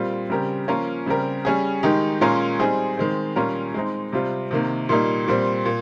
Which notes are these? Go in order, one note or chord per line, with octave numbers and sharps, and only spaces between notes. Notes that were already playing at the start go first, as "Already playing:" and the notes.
Already playing: A#2 G3 C4 F4
C#3 G3 C4 G4 A#4
F3 A#3 C#4 F4 A#4
C#3 G3 C4 G4 A#4
G3 C#4 G#4
D#3 G#3 D#4 G4
A#2 G#3 C#4 F4 A#4
G3 C4 D#4 G#4
D#3 G#3 C4
A#2 G3 C#4 F4 A#4
G#3 C4 D#4
C3 G3 C4 F4
C3 D#3 A#3
A#2 G3 A#3 D#4
A#2 G3 C4
A#2